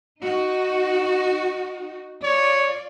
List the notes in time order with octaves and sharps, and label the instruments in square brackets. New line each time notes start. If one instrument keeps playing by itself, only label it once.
[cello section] D#4 F#4
[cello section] F4 D5 [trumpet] C#5